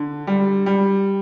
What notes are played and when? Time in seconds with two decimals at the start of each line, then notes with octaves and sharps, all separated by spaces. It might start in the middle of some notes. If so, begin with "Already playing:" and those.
Already playing: D3
0.27 G3
0.66 G3